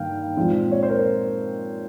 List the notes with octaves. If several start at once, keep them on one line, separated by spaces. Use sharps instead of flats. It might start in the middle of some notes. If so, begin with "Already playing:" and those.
Already playing: G2 D#3 A#3 F5 G5
A#2 F3 G#3 C4
C#5
C5
A#4